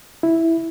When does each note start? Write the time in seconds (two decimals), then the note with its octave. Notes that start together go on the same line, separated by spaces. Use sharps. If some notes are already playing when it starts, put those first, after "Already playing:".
0.23 E4